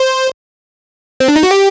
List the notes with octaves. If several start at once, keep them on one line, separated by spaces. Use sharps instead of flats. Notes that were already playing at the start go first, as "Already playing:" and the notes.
Already playing: C5
C4
D4
D#4
F#4
G4